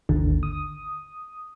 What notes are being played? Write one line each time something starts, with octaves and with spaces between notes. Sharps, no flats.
G#1 D#2 D3
D#6